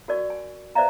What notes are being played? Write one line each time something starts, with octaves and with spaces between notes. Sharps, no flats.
F#4 A#4 D5 C#6
G#5
B4 C5 D5 E5 F5 A#5